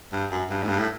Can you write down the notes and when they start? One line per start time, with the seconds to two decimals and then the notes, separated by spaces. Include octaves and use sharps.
0.12 G2
0.30 F#2
0.50 G2
0.63 G#2
0.68 G2
0.79 A2